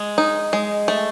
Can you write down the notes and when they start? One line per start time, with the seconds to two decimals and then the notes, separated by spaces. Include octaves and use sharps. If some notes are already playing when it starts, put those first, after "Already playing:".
Already playing: G#3
0.18 D#4
0.53 G#3
0.88 A3